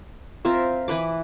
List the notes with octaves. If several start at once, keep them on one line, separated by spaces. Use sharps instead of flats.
C4 F4 A#4 E5
E3 E4 B4 D6